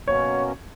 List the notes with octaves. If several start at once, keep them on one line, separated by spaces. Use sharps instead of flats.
B2 F#3 A#3 C#4 F#4 C#5